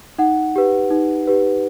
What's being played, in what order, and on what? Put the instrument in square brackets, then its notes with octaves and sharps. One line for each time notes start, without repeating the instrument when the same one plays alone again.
[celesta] D#4 F#5
G4 B4
D#4
G4 B4